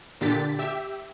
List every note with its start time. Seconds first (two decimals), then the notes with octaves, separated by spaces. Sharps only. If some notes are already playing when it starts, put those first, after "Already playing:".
0.21 A#2 D3 G4 A6 B6
0.59 G4 E5